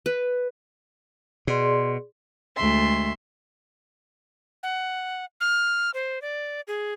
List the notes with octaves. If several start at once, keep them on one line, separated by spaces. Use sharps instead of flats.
B4
B2 G#4 D5 C6
D2 G#3 A3 E5 C6
F#5
F6
C5
D5
G#4